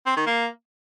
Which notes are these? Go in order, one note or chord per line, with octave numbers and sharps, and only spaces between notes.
C4
D#3
A#3